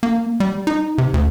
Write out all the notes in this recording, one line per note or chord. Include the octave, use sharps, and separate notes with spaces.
A#3
G3
D#4
C3
D2